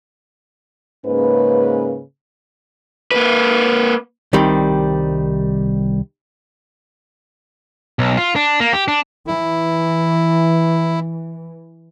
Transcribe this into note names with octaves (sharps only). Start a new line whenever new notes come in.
G#2 C#3 A#3 C#4 B4
A#3 B4
C2 C3 D#3 G3
B1
F4
D4
A#3
G4
D4
E3 E4